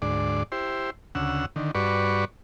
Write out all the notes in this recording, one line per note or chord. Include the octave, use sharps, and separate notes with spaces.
D2 G#2 D5
E4 G4 C5
D2 C#3 F#5 E6
D3 D#3
G2 F#4 B4 D5 C#6